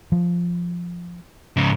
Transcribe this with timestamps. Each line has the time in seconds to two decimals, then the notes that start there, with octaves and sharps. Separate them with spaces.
0.12 F3
1.57 G#2 C#3